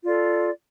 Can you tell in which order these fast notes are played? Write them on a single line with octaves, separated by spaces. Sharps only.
F4 D5 A4